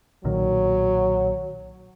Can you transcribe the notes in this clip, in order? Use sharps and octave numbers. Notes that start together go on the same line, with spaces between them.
B1 A#2 D#3 F#3